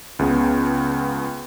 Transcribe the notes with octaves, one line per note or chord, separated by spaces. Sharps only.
C#2 C#3 B3